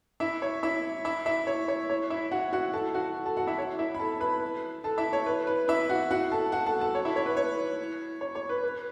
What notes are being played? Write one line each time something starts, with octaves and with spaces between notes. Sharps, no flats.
E4 E5
C#5
E4 E5
E4 E5
E4 E5
C#5
C#5
C#5
E4 E5
F#4 F#5
F#4 F#5
A4 A5
F#4 F#5
A4 A5
F#4 F#5
E4 E5
C#5
E4 E5
B5
A4 A5
B4 B5
A4 A5
E4 E5
C#5
B4
B4
E4 E5
F#4 F#5
F#4 F#5
A4 A5
F#4 F#5
A4 A5
A4 A5
C#5
E4 E5
C#5
B4
C#5
C#5
C#5
B4
B4